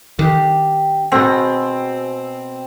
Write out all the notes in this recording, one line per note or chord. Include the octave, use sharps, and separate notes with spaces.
D#3 D4 G4
B2 C4 F#4 G#4